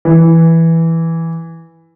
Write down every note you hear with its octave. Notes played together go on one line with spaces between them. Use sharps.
E3